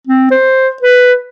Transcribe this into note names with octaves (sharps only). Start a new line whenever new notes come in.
C4
C5
B4